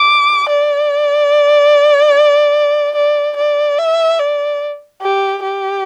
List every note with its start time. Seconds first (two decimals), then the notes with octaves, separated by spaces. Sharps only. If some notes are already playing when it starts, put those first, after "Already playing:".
Already playing: D6
0.49 D5
2.96 D5
3.37 D5
3.78 E5
4.20 D5
5.02 G4
5.43 G4